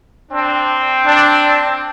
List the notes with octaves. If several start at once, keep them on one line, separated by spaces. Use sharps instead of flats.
C4 D4
D4